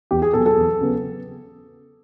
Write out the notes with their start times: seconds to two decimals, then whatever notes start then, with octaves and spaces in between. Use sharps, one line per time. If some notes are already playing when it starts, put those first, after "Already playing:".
0.11 E2 G4
0.22 G#4
0.33 B2 F#3 A4
0.46 A4
0.57 E2
0.81 C#3 F#3 B3